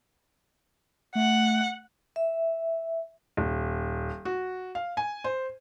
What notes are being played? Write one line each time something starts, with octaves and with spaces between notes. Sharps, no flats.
A3 F#5
E5
D#1
F#4
F5
G#5
C5